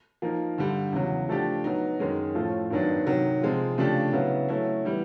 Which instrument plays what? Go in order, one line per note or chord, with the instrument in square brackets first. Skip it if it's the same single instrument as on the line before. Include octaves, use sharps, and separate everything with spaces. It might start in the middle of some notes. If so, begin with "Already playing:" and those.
[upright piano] F3 A#3 D#4
G2 D3 G3
E2 C#3 F#3
F3 A3 D4 G4
F#3 B3 D#4
F#2 D#3 G#3 C#4
A2 F3 A3 C#4 F4
G2 D#3 F#3 B3 D4
C3 D#3 F#3
C3 F3 G#3 C4 F4
C#3 F3 A3 D4 G4
C#3 F#3 B3 E4
F#3 A3 C#4 E4
E3 G3 B3